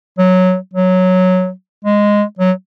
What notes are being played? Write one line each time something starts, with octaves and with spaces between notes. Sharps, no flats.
F#3
F#3
G#3
F#3